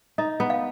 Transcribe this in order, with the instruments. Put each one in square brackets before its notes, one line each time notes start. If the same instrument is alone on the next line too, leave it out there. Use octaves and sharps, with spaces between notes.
[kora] D#4 [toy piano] D#5
[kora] B3
[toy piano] F5